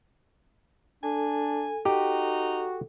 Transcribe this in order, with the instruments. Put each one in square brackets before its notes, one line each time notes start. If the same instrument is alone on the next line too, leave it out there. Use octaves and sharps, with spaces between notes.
[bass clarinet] D4 [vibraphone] A4 [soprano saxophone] G#5
[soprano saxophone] D#4 [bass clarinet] F#4 [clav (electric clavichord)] G4